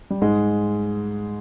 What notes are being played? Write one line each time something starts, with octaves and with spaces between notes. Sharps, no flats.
G3
G#2 G#3